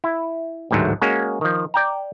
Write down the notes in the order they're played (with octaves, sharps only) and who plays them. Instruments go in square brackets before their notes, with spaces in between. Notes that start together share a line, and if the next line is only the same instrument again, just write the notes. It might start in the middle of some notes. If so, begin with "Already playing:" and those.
[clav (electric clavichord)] E4
A1 D2 G#2 D#3 F#3 A3
G#3 A#3 C#4 F#4
D#3 F3
D5 G5 A#5